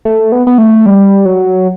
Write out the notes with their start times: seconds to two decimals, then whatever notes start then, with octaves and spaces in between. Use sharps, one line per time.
0.05 A3
0.32 B3
0.47 B3
0.58 A3
0.86 G3
1.25 F#3